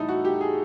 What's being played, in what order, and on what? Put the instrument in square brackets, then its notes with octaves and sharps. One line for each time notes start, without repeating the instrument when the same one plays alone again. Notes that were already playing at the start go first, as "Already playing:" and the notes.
Already playing: [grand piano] A2 E3 G3 D#4 E4 A4
F#4
G4
G#4